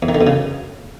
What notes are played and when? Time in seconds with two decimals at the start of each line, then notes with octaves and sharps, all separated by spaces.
0.02 E2
0.09 D#3
0.15 D3
0.21 B2
0.27 C#3